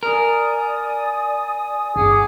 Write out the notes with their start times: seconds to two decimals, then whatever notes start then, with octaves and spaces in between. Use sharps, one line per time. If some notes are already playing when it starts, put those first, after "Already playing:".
0.03 A#4 D5 G#5 D#6
1.96 G1 G#4 F#5 D6